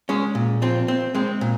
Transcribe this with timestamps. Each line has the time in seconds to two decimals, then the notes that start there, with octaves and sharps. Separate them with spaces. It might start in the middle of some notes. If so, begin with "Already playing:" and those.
0.09 G#3 C#4
0.35 A#2
0.62 F3 C4
0.88 C4
1.15 G#3 C4
1.41 A#2